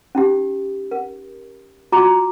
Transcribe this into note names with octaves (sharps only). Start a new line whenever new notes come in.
C#4 D#4 G4
A#4
F4 F#4 A#5 D6